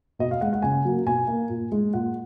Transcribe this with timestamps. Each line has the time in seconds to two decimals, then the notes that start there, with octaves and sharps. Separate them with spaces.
0.19 B2 D#5
0.31 F5
0.41 G#3 F#5
0.53 F#5
0.62 C#3 G#5
0.85 F#3 A#3
1.06 B2 G#5
1.27 A#3
1.49 A#2
1.72 G#3
1.94 A#2 F#5